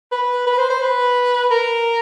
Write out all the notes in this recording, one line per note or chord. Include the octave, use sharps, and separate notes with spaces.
B4
B4
C5
C5
B4
A#4